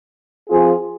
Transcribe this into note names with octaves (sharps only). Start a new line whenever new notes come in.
F3 C4 F4 G#4